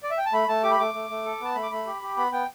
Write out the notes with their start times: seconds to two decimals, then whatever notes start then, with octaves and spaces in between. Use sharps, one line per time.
0.03 D5
0.11 E5
0.18 G5
0.26 A5
0.33 A3 B5
0.48 A3 A5
0.63 G4 D6
0.71 B5
0.79 A3 D6
0.94 A3
1.10 A3
1.25 A4
1.41 B3 A5
1.55 A3 B5
1.63 D6
1.71 A3 B5
1.86 G4
2.02 G4
2.17 B3 B5
2.32 B3 G5